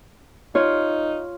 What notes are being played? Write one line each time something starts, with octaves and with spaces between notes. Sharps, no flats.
D#4 F4 C#5